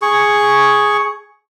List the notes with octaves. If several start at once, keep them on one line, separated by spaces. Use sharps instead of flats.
G#4 C#6